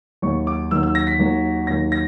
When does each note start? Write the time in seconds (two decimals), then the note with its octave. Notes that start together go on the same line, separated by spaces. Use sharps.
0.22 D#2 D#3 F#3 C#6
0.47 D6
0.71 D#2 D#3 F#3 E6
0.83 E6
0.95 A#6
1.07 B6
1.19 D#2 D#3 F#3
1.67 D#2 D#3 F#3 A#6
1.92 A#6